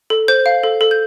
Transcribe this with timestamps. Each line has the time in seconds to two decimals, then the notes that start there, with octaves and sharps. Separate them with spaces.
0.10 A4
0.28 C5 G6
0.46 F5
0.64 A4
0.81 A4
0.91 G6